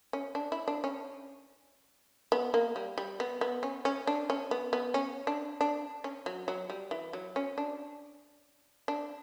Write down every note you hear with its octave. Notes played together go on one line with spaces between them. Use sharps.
C#4
D4
E4
D4
C#4
B3
A#3
G3
G3
B3
B3
C#4
C#4
D4
C#4
B3
B3
C#4
D4
D4
C#4
F#3
F#3
G3
E3
F#3
C#4
D4
D4